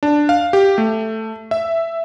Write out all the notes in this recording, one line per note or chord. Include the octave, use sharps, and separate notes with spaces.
D4
F5
G4
A3
E5